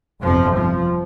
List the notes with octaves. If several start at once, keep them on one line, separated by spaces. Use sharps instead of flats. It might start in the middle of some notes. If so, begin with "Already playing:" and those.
G1 F2 C3 F3
F3